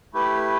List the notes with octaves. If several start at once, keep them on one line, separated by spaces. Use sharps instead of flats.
A3 E4 G4 B4